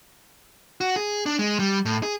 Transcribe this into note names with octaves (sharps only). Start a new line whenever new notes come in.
F#4
G#4
D4
G#3
G3
A2
G#4